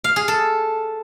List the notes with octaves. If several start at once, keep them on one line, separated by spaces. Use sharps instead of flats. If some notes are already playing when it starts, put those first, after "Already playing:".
F5
G#4
A4